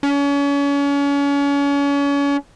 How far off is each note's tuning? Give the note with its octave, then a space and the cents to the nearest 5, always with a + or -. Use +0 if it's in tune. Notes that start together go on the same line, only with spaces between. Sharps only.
C#4 +35